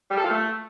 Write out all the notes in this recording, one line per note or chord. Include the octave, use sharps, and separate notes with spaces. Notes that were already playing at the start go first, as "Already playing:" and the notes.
G3
A4
F4
A3